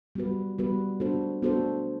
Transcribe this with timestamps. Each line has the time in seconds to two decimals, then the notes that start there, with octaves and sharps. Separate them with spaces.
0.15 G3 B3 F#4 B4
0.58 G3 B3 F#4 B4
1.00 B3 D4 F#4 A4 C5
1.42 B3 D4 F#4 A4 C5